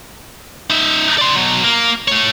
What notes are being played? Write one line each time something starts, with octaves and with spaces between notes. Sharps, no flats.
D#4 E5
D5 C6
B2 F#3
A#3
A3 C#5